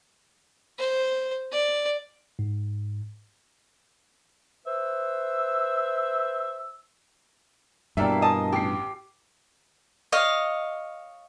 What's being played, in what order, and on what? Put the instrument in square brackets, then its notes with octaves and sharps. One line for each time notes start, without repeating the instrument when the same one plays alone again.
[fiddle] C5
D5
[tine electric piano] G#2
[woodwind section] B4 C5 E5 E6
[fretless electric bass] G2 B2 [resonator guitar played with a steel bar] E3 A#3 A4 [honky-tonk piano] G4 D5 E5
[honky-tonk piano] D#5 [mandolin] G#5 A5 D#6
[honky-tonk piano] A1 C7 [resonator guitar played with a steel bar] G4
[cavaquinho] C#5 D#5 F5